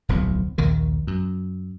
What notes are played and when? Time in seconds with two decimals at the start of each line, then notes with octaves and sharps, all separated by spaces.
0.09 D1 B1 F2 C3
0.58 A#1 D#2 D#3
1.07 F#2